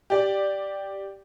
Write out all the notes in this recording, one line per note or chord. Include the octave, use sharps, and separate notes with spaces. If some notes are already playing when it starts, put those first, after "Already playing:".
G4 D5